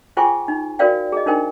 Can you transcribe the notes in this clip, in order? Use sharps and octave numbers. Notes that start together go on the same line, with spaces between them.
F4 G#4 C5 G5 G#5 C#6
D#4
F#4 A#4 C5 D5 F5 G5
G#4 D#5
D4 D#4 A#4 C5 G5